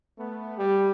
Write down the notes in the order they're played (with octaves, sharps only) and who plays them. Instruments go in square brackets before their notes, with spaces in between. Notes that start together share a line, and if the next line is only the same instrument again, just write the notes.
[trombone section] A3 B3
[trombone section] G3 [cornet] G4